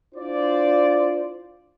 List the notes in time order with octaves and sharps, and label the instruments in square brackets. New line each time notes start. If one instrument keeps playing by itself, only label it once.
[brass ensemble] D4 E4 F4 C5 D5